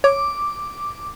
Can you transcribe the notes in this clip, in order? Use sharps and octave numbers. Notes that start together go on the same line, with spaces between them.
C#5 D6